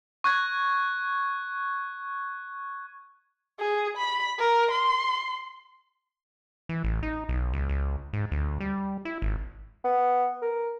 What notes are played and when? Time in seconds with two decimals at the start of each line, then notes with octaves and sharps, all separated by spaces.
0.24 C#6 F#6 G#6
3.60 G#4
3.97 B5
4.39 A#4
4.71 C6
6.69 E3
6.84 A1
7.03 D#4
7.29 B1
7.53 C#2
7.69 C#2
8.13 G#2
8.31 D2
8.60 G3
9.05 E4
9.22 G#1
9.84 B3
10.42 A#4